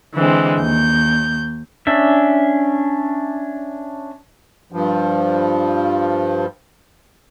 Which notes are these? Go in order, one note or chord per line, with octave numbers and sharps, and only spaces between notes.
D3 E3 G#3 C4
D#2 G6
C#4 D4 E5
G2 F3